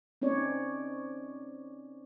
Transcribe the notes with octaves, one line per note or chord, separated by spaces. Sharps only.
C4 C#4 D#4 C#5 D5